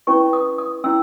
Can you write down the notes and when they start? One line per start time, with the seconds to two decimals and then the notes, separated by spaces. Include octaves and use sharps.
0.07 C#4 E4 B4 C#6
0.33 D#6
0.58 D#6
0.84 C#4 E4 E6